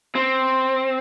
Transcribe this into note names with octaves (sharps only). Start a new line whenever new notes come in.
C4